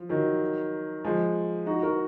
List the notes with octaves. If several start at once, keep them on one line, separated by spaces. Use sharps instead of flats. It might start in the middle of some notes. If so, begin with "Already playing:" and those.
Already playing: F3
D#3 F#3
F3 G#3
D#4 F#4
F#4 A#4